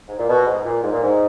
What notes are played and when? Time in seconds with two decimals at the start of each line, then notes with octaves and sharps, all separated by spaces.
0.09 G#2
0.19 A#2
0.28 B2
0.46 G#2
0.65 A#2
0.83 G#2
0.92 A#2
1.03 G#2